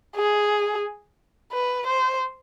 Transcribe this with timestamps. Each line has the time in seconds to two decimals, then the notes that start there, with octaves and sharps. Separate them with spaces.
0.16 G#4
1.52 B4
1.87 C5